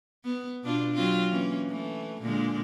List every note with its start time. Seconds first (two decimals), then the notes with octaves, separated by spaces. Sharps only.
0.25 B3
0.64 B2 D4 F4
0.94 F#3 C4 F4
1.31 E3 A#3 C#4
1.70 E3 A3
2.22 A#2 D3 G#3